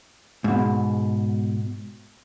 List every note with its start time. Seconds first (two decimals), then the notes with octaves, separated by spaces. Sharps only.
0.44 G#2 B2